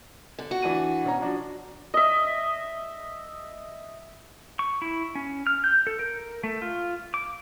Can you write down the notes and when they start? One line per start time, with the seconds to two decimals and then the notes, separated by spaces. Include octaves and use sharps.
0.39 D3
0.51 F#4
0.62 E3 D4 D#7
1.04 B2 C#4 A#5
1.21 F3 D4 F#4
1.94 D#5 E5
4.59 C#6
4.82 E4
5.15 C#4
5.47 F6
5.64 G6
5.87 A4
5.99 A#4
6.44 A3
6.62 F4
7.14 D6